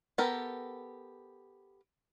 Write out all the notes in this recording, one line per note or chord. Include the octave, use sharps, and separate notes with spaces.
B3 G4 A4 A#4